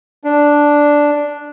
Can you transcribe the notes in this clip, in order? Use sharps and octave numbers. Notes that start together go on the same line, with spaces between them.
D4